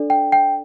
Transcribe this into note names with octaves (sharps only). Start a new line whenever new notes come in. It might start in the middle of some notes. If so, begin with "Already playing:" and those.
Already playing: D4 A4 D5
G5
G5